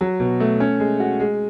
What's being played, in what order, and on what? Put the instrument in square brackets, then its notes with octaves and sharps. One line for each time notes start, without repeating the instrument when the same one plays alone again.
[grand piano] F#3
B2
A3
C#4
G#3
F#4
G#3